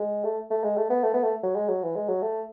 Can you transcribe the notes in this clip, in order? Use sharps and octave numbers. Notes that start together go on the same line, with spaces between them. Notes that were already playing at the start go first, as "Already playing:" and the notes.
Already playing: G#3
A3
A3
G#3
A3
B3
A3
B3
A3
F#3
G#3
F#3
E3
G#3
F#3
A3